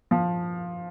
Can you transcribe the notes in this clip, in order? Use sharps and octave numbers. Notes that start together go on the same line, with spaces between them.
F3